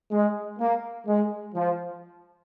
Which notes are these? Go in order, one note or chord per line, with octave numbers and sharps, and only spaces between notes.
G#3
A#3
G#3
F3